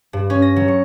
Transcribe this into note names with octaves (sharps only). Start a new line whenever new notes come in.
G2
C#4
A#6
F#3
C#6